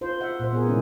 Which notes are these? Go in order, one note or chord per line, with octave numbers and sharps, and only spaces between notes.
F4 C5
E5 F#5
A#2 C5
B3 G#4 A#4
C3 D#3 G#3 A#3 C#4 E4